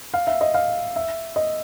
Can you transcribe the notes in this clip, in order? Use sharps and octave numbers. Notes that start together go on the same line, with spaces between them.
F5
E5
D#5
F5
E5
D#5